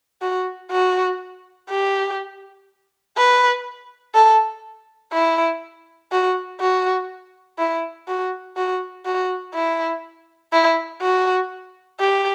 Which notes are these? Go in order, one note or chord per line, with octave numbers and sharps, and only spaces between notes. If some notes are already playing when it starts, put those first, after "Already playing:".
F#4
F#4
G4
B4
A4
E4
F#4
F#4
E4
F#4
F#4
F#4
E4
E4
F#4
G4